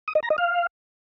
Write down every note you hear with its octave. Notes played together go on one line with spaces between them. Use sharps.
D#6
D#5
A#5
D#5
F5